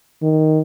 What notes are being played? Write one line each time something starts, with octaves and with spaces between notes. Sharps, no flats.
D#3